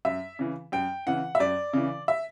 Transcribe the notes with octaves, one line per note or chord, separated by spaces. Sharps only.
F#2 E5
C#3 E3
F#2 G5
C#3 E3 F#5
E5
F#2 D5
C#3 E3
E5